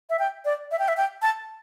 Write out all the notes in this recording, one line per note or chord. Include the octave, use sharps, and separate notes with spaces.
E5
G5
D5
E5
G5
E5
G5
A5